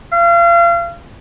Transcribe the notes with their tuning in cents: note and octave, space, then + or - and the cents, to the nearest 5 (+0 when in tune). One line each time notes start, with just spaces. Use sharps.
F5 -35